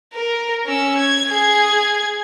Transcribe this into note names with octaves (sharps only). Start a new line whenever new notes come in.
A#4
C#4 E6
G#6
G#4 G#6